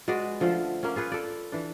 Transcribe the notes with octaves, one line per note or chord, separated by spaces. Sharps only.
G#3 F#4 B4 D5
D3 F3 A3 F4
A#3 C#4
F4 G#4 B4 C#5
A4 D5
E3 D4